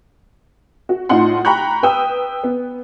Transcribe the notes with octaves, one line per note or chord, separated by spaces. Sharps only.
F#4
A2 D#4 F4 F#5 C6
G5 A#5 B5 C#6 F#6
B4 G5 D#6 E6
B3